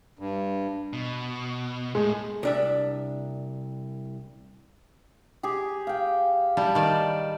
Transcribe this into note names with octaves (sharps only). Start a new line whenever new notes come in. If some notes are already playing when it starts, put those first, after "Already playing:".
G2
B2
A2 G#3
C2 D4 E5
G4 G#4
F5 G5
G3 E4 A5 B5
D#3 D5